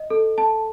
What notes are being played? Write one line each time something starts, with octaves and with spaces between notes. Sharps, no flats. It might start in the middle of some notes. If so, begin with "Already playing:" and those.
Already playing: D#5
A4
A5